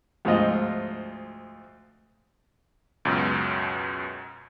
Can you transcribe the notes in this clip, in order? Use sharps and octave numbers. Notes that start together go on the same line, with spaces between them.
D2 G#2 F3 F4 D#5
C#2 F#2 B2